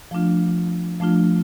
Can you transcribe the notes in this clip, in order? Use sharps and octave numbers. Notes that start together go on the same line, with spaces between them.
F3 A3 D4 F4
F3 A3 D4 F4